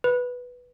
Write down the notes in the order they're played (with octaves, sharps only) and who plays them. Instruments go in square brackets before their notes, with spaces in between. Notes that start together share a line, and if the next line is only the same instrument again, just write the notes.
[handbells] B4